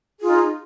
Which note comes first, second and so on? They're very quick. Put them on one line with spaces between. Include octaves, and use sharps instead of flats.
G#4 F4 D#4